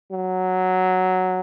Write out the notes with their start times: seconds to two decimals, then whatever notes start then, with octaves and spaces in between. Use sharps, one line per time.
0.12 F#3